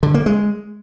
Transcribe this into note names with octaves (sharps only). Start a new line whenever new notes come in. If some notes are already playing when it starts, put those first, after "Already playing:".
D3
A#3
G#3